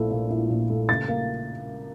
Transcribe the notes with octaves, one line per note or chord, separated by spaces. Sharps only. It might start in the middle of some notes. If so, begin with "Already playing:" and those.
Already playing: A#1 A#2 A3 E4
A#2
E4
A#1
A3
C#3 A6
A#3